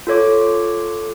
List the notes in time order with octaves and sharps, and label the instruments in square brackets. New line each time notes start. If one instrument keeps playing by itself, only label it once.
[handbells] F4 A4 C#5 D6